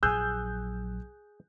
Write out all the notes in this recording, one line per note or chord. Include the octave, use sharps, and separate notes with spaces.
A#1 F#3 G#4 G#5 E6 F#6 G6